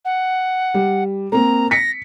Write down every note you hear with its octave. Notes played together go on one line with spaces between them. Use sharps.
F#5
G3
A#3 C4 A#5
A#6 B6 C#7